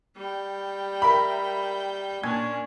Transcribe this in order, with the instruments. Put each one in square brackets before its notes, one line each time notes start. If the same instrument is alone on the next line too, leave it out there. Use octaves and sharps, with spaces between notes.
[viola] G3 G5
[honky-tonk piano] A#4 E5 B5
[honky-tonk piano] A#2 G#5 G#6 [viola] C#4 D4